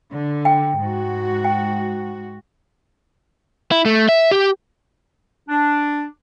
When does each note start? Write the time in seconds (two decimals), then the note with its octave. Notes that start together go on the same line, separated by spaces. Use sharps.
0.13 D3
0.45 G5
0.80 G#2 F#4
1.44 G5
3.71 E4
3.86 A3
4.09 E5
4.31 G4
5.48 D4